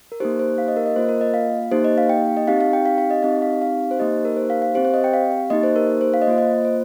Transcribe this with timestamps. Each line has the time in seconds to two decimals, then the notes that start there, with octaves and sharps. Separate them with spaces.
0.12 A#4
0.20 A#3 D#4 G4 C5
0.39 C5
0.58 F5
0.68 D#5
0.76 A#4
0.86 D#5
0.96 A#3 F4 C5
1.09 A#4
1.21 D#5
1.34 F5
1.71 A#3 D#4 G4 C5
1.85 D#5
1.98 F5
2.09 G5
2.37 D#5
2.47 C4 D#4 G4 F5
2.60 F5
2.73 G5
2.86 F5
2.98 F5
3.10 D#5
3.23 C4 D#4 G4 D#5
3.42 F5
3.62 F5
3.91 C5
3.99 A#3 D#4 G4 D#5
4.25 A#4
4.37 C5
4.50 F5
4.62 F5
4.75 C4 G4 C5
4.85 C5
4.94 D#5
5.04 G5
5.13 F5
5.50 A#3 D#4 G4 D#5
5.63 C5
5.76 A#4
6.01 C5
6.14 F5
6.22 D#5
6.27 A#3 F4 C5
6.38 D#5
6.65 C5